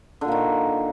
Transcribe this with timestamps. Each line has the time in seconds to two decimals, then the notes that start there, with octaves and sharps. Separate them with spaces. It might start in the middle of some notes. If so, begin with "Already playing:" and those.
0.21 D3
0.25 A#2
0.28 A#3
0.32 D#3